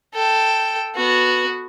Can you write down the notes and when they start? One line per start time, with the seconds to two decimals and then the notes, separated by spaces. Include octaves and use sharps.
0.14 A4 G5
0.96 B3 F#4